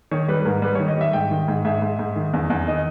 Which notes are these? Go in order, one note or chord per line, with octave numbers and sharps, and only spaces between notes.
D#3 C#5
G3 B4
B4
G#2 A#4
G3 B4
C#5
D#3
D#5
G3 E5
G#2 G5
D#3
G#2
G#2 E5
G#2
G#2
D#3
E2
E2
D#3 D#5